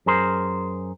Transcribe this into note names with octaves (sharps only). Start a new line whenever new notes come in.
F#2 G#4 A#4 C5